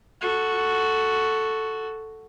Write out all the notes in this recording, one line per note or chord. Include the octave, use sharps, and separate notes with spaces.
F#4 A4